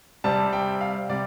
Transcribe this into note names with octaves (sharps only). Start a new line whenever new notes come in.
C3 G3 C4 A5
G5
F5
C3 G3 D5